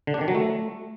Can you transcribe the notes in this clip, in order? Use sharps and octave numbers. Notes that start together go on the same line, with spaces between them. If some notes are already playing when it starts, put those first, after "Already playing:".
D3
D4
D#3
F#3
A3